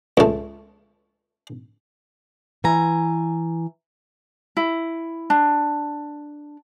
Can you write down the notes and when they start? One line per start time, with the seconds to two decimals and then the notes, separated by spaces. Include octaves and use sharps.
0.17 C#2 A3
2.64 E3 G#5 A#5
4.57 E4
5.30 D4